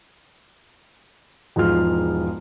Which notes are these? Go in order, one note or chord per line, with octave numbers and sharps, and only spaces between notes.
E1 G#2 F3 F4 F6